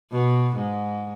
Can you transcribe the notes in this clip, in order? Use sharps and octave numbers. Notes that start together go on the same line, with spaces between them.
B2
G#2